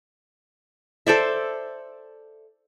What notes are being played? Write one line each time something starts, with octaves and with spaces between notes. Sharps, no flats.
A4 C5 D5 E5